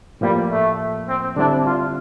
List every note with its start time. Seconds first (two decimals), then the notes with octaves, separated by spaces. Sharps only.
0.21 A2 F3 G3 A#3 F4
0.50 A3
1.07 C4
1.36 D3 G3 C4 D4 E4
1.65 F4